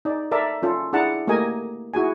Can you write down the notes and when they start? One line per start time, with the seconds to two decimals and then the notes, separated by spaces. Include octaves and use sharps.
0.05 D#4 D5
0.31 A4 A#4 D5 E5 A5
0.62 C#4 F4 A4
0.93 D4 E4 G#4 F#5 A5 A#5
1.27 A3 A#3 G4 A#4 D#5 G#5
1.94 E4 F#4 G#4 G#5